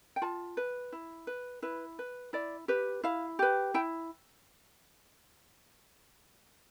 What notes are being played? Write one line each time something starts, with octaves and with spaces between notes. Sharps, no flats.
G5
F4 A5
B4
E4
B4
E4 B4
B4
E4 D5
G4 B4
E4 F5
G4 B4
E4 G5